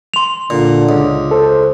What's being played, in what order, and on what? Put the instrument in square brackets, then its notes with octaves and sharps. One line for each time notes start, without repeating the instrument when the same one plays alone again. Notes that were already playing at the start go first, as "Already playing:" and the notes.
[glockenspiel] C6 F7
[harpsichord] A#2 [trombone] D3
[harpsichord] C#2
[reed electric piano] A4 [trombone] C5